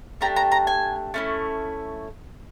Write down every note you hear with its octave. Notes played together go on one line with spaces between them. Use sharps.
A3 D4 G4 A#5
A#5
A#5
G#5
A3 C#4 E4